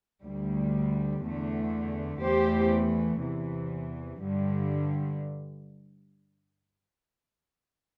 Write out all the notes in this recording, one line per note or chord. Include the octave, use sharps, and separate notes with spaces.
D2 D3 G3
E2 D3 A3
E2 E3 A3 G4 C5
E2 C3 E3
G2 D3 G3